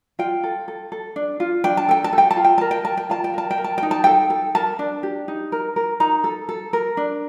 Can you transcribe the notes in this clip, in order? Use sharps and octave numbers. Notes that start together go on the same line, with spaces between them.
F4 G5
A4
A4
A4
D4
F4
D4 G5
A5
A4 G5
A5
A4 G5
A5
F4
G5
A#4 A5
G5
A#4 A5
G5
F4 A5
G5
A#4 A5
G5
A#4
A5
D#4 G5
A5
A4 G5
A4
A#4 A5
D4
G4
D#4
A#4
A#4
D#4 A#5
A4
A4
A#4
D4